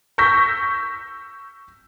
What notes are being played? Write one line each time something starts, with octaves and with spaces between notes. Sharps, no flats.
C#6 E6 G6 A#6 B6